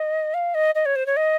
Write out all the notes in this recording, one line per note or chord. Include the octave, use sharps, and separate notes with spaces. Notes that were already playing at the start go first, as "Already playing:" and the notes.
Already playing: D#5
F5
D#5
D#5
C#5
C5
C#5
D#5